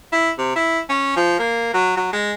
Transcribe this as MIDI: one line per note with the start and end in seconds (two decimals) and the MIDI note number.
0.12 0.30 64
0.38 0.55 48
0.56 0.80 64
0.89 1.16 61
1.17 1.39 53
1.39 1.74 58
1.74 1.96 54
1.97 2.13 54
2.13 2.33 56